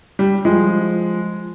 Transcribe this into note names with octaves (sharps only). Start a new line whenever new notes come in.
G3
F3 G#3